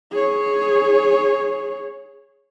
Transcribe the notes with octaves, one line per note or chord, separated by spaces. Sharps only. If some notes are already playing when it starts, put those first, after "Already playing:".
G#4 C#5